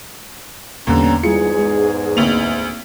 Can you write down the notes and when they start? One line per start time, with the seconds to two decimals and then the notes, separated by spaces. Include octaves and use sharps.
0.87 B1 E2 A#2 D3 G3 B3 C#4 A#5
1.23 E2 G#2 G3 E4 F4 G#4 C#7
1.59 G#3
2.17 D2 A#3 C4 F7